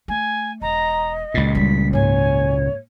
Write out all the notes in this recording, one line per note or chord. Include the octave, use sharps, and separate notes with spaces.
A3 G#5
E1 D#5 A#5
C#2 A#2 A6
G3 A3 B6
G#2 A#3 C#5 G#5